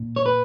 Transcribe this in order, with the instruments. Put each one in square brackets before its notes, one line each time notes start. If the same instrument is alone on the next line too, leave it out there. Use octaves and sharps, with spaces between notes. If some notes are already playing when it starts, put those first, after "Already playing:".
Already playing: [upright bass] A#2
[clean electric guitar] C#5
B4